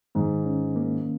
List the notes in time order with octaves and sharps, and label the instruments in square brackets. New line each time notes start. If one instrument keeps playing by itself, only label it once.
[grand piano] G#2 [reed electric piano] D#3
[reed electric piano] C#4
A#3